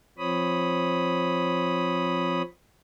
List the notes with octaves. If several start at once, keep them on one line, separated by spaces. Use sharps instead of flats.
F3 C4 C#5 B5 D#6